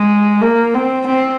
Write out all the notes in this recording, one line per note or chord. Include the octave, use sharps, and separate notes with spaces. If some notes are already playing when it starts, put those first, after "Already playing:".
Already playing: G#3
A#3
C4
C4